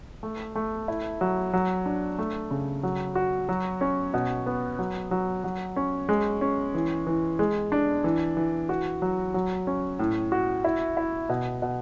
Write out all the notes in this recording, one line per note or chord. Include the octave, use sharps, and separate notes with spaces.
A3
A3
E4
F#3
F#3
D4
A3
C#3
F#3
F#4
F#3
C#4
B2
B3
F#3
F#3
F#3
C#4
G#3
C#4
E3
E3
G#3
D4
E3
E3
F#4
F#3
F#3
C#4
A2
F#4
E4
E4
B2
B2